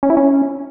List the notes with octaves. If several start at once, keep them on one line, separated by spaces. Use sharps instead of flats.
C#4
E4
C#4